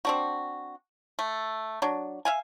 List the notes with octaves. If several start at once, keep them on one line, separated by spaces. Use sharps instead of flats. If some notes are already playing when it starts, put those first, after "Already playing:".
C4 D4 F#4
A3
F#3 D4
E5 F5 G#5